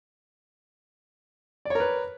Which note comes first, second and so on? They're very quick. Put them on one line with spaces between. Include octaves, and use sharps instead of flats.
D5 C#5 A#4 B4